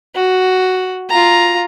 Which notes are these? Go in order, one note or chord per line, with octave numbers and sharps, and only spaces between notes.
F#4
F4 A#5